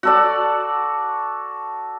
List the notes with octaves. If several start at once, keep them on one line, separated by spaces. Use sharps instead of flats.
F#4 A4 D5